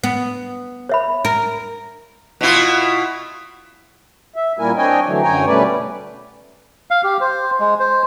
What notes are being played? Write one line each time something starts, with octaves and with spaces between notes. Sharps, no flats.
B3
C#5 E5 B5
A#4
B2 E4 F4
E5
A#2 G3 A#3 E4 A#4 G#5
C4 D4 C#5 D#5 G5 G#5
D3 E3 F#3 A3
F#2 D3 C#5 G5 G#5 A#5
B2 G3 A3 C#4 B4 D5
F5
G4
C5
G#3
C5